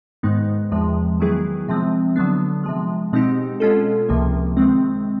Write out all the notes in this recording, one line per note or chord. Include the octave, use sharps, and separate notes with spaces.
G#2 D#3 G#3 B3 D#4
E2 C3 F3 G#3
D#3 F#3 B3 E4 G#4
C3 F3 G#3 C4
D3 F#3 B3 D4
C3 F3 G#3
B2 G#3 C4 D#4 G4
B2 G#3 C#4 F4 A4
C#2 C3 F3 A#3
C3 D#3 G#3 C4